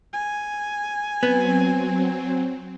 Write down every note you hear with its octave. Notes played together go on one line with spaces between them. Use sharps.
G#5
F#3 B3 C4